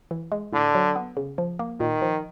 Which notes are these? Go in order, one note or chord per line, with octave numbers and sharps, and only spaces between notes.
E3
G#3
A2 D3
F#3
B3
C#3
F3
A#3
A#2 D#3
F3